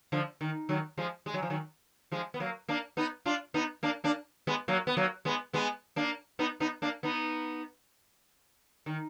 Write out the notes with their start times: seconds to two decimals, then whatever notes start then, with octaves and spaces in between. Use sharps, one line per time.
0.12 D3 F3
0.41 D#3
0.69 D#3 F#3
0.98 F3 G#3
1.26 G#3
1.34 F#3
1.43 F3
1.50 D#3 F#3
2.12 F3 G#3
2.34 B3
2.40 F#3 A#3
2.69 A#3 D4
2.97 B3 D#4
3.26 D4 F4
3.54 B3 D#4
3.83 A#3 D4
4.04 A#3 D4
4.47 G#3 B3
4.68 F#3 A#3
4.87 B3
4.97 F#3 A#3
5.25 G#3 B3
5.53 G#3 B3
5.96 A#3 D4
6.39 B3 D#4
6.60 B3 D#4
6.82 A#3 D4
7.03 B3 D#4
8.86 D#3